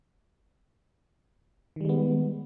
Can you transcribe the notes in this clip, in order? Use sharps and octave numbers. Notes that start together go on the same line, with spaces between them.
D#3 G3 G#3 B3